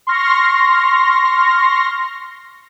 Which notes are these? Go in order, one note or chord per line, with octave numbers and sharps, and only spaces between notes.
C6 C#6 F6 A#6